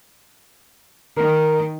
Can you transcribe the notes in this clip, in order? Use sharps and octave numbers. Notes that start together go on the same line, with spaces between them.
D#3 A#4